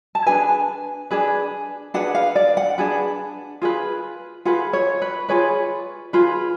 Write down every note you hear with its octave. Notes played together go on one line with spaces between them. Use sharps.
A5
D4 G#4 B4 G#5
D4 G#4 B4
D4 G#4 B4 F#5
F5
D5
F#5
D4 G#4 B4
F4 G#4 B4
F4 G#4 B4 F#5
C#5
B4
F4 G#4 B4 C#5
F4 G#4 B4